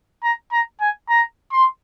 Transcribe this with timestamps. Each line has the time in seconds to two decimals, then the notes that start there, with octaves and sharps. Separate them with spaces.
0.24 A#5
0.52 A#5
0.81 G#5
1.09 A#5
1.52 C6